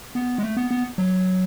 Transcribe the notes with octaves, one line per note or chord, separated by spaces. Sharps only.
B3
G#3
A3
B3
B3
F#3